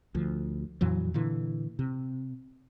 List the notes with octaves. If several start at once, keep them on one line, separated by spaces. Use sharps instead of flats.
D2 F3
F2 A#2 E3 F#3
A#2 D3 E3
C3